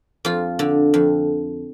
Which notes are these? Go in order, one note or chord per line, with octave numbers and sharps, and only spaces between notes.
F2 F4
D3
F2